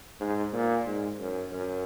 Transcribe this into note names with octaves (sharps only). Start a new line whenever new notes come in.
G#2
A#2
G#2
F#2
F#2